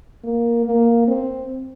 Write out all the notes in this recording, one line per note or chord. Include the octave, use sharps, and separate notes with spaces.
A#3
A#3
C4